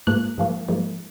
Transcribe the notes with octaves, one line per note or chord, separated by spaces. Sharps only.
G#2 F3 A#3 F#6
G#2 F3 A#3
G#2 F3 A#3